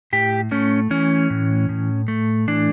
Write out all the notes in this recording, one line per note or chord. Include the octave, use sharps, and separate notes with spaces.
A2 G4
A3 C#4
E3 C#4
A2
A2
A3
E3 D4